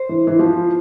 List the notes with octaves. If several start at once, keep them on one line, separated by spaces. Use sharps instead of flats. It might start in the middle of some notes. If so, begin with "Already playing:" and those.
Already playing: C5
E3
E3
F3